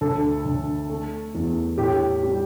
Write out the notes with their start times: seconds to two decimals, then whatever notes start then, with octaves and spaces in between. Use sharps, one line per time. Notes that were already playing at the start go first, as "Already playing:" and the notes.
0.01 D2 A4
0.45 D2
0.90 A3
1.34 E2
1.78 A2 G4
2.23 G3